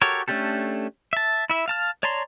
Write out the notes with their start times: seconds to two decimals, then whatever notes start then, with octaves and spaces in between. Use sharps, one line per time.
0.02 F#4 G4 A4 A#4 C#5
0.28 A3 C#4 D4 G4 A4
1.13 E5 A5
1.50 E4 E5
1.68 F5 A5 F6
2.03 C#5 D5 A5 A#5 C6